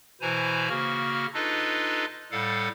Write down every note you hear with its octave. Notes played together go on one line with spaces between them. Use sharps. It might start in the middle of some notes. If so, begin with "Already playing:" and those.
B2 E3 E4 C5 G#5 A#5
C#3 A#3 F#4 F6
D4 D#4 F4 A4 B4 D#5
A2 G3 A4 F5 F#5